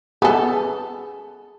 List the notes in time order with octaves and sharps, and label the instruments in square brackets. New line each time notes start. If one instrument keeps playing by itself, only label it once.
[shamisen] B3 A4 [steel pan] G#4